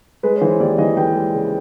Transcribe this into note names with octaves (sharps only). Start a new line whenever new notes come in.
G#3 B4
C#5
E3 C5
D#2 D5
E3 D#5
E3 G5
G#3
C#3